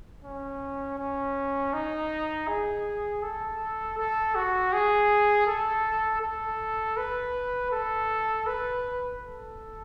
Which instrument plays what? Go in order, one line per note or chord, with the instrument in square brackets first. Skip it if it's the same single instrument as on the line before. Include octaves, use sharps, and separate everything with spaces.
[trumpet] C#4
C#4
D#4
G#4
A4
A4
F#4
G#4
A4
A4
B4
A4
B4
A4